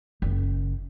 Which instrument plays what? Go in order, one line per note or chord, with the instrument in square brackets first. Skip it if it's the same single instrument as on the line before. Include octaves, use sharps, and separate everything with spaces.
[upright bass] F#1 C#3